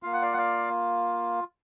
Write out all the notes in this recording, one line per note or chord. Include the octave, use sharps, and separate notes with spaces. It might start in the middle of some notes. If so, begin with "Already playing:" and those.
A#3 F4 F5
F#5
D5 F5
F#5
D5 F5